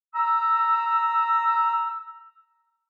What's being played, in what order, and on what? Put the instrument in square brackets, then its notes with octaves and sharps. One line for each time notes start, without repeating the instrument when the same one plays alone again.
[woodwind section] A#5 E6